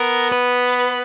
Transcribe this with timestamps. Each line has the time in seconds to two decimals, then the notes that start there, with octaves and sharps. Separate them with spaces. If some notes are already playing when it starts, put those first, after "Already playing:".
Already playing: B3 A#4
0.32 B4